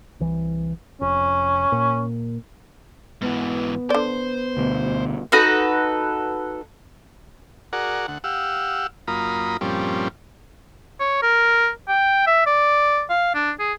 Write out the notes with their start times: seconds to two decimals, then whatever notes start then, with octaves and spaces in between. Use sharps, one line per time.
0.20 C2 E3
1.01 F1 C#4
1.72 A#2
3.21 G#2 E3 B3
3.90 D3 C5 D5
4.57 D2 B2
5.32 D#4 F#4 A4 B4
7.73 F#4 G#4 A#4 D5 F#5
8.08 D2 F#5
8.24 G4 F5 F#5 E6
9.08 F#2 A#3 F4 A#5 B5 D#6
9.61 G2 A#2 F3 G3 C4 C#4
10.99 C#5
11.22 A#4
11.88 G5
12.26 E5
12.46 D5
13.10 F5
13.34 D4
13.59 G#4